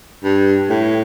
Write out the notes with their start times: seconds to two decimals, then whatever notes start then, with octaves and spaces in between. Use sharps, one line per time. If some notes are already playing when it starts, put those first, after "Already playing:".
0.24 G2
0.70 A2